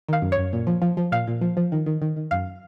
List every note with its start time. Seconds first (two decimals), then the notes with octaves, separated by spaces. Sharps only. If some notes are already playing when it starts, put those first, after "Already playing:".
0.08 D#3 F5
0.22 F#2
0.32 C#5
0.37 F#2
0.53 A#2
0.67 F3
0.82 F3
0.97 F3
1.12 A#2 F5
1.27 A#2
1.41 F3
1.57 F3
1.72 D#3
1.86 D#3
2.02 D#3
2.16 D#3
2.31 F#2 F5